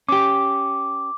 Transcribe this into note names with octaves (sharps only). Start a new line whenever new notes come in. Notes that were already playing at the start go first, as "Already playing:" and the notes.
C#4 G4 D6